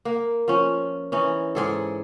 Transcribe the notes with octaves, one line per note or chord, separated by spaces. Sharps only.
A#3
F3 C#4
E3 C#4 D#4
G#2 G#4 A4